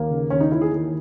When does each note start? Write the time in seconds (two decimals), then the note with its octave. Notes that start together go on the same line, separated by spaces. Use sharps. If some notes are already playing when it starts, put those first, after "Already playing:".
Already playing: D#2 A#3
0.10 C#3
0.30 D#2 C#4
0.41 D#4
0.52 E3 E4
0.62 G#4
0.71 D#2